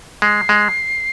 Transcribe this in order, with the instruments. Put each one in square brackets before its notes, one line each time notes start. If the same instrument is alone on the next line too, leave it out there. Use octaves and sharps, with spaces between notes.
[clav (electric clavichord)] G#3 [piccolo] C7
[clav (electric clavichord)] G#3